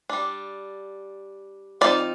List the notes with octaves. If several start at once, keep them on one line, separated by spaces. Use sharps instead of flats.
G3 D4
F3 C4 D#4 D5